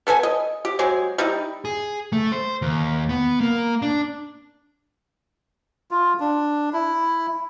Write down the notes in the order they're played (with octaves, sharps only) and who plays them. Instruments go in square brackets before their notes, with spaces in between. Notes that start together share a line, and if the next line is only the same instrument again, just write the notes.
[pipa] B3 A4 B4 G#5
D#5
G4
F#3 G#3 C4 G#4
G3 D#4 E4
[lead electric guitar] G#4
A3
C5
D#2
B3
A#3
D4
[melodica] F4
D4
E4